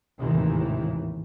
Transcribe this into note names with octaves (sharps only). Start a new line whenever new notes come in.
G#1 D#2 A2 C3 D#3 E3